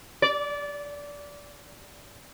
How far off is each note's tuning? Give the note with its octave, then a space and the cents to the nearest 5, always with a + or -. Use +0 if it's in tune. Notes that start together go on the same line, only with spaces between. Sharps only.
D5 -20